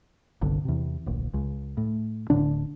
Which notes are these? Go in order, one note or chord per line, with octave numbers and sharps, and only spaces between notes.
G1 C2 D3
E2 C3
D1 A#1
C#2
A2
D1 A2 D3 D4